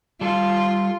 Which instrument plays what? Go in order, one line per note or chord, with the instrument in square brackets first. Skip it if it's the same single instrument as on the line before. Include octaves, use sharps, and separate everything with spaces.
[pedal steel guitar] G3 A4 [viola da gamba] F4